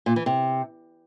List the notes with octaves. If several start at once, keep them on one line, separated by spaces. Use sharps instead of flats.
A#2
E3
C3